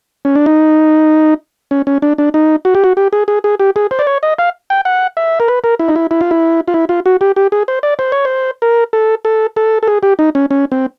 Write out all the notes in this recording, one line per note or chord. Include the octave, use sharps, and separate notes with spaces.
C#4
D4
D#4
C#4
C#4
D4
D4
D#4
F#4
G4
F#4
G4
G#4
G#4
G#4
G4
G#4
C5
D5
C#5
D#5
F5
G5
F#5
E5
A#4
B4
A#4
E4
D#4
E4
E4
F4
E4
F4
E4
F4
F#4
G4
G4
G#4
C5
D5
C5
C#5
C5
A#4
A4
A4
A4
A4
G#4
G4
D#4
C#4
C#4
C4